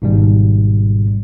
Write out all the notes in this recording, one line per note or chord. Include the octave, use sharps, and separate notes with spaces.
G#1 G#2 B2 G3